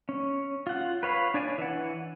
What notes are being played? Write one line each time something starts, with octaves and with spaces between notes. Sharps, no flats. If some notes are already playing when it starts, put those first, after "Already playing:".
C#4
F4 F#5
B4 C#5 F5 B5
D4 C#5 D5 G#5
E3 F#5